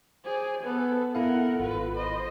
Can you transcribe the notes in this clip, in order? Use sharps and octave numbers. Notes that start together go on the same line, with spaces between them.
G#4 C5 D5
B3 A4 B4
B3 E4 A4 A#4 F5 F#5
G#1 F4 B4
C5 D#5 B5